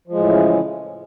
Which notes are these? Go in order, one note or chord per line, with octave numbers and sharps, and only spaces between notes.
A2 C#3 E3 F3 G#3